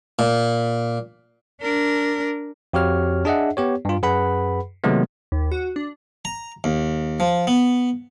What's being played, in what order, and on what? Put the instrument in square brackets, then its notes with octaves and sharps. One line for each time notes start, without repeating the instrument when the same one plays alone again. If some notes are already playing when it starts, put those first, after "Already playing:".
[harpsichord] A#2
[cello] D4 A#4
[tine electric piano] F2 F#4 G4 C#5 F6
D4 G#4 D#5 E5 F#5
B3 G4 C#5
G2 F4
F#2 G#4 B4 F#5 B5
C3 D#3 F#3 G#3 A3 B3
[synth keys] D#2
F#4
D4
[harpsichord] A#5
D#2
F3
B3